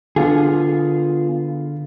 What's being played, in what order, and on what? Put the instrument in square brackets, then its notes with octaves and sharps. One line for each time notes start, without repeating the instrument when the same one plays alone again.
[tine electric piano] D3 [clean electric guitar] B3 F4 G#4